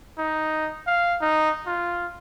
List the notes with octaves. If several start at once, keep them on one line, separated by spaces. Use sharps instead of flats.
D#4
F5
D#4
F4